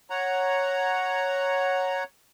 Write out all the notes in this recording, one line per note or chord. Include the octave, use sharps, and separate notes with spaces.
C#5 F#5 A#5